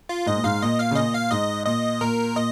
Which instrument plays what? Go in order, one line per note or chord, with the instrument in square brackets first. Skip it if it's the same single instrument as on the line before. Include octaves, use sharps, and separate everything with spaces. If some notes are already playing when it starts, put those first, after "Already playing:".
[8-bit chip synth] F4
[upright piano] G#2 [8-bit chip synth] D#5
[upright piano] A#2
[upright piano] G#2 [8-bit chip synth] F5
[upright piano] A#2 [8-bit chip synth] D#5
[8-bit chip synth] F5
[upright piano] C#3
[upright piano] A#2 [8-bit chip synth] D#5
[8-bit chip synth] F5
[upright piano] G#2 [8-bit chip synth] D#5
[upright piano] A#2 [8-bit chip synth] D#5
[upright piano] A#2 [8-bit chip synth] A#4
[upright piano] A#2 [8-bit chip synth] D#5